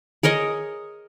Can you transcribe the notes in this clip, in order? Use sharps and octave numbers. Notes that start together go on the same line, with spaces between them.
G#4 A#4 C#5 D#5